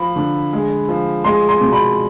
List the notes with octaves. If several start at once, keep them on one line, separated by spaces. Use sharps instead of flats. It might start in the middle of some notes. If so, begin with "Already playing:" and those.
Already playing: F3 B5
D3
G#3
F3
G#3 C6
C6
B2
B5